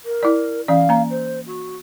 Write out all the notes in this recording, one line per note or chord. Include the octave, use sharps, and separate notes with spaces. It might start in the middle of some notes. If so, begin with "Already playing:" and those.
A#4
E4 D5
E3 C#4 D5 F5
A#3 A#5
C5
F#4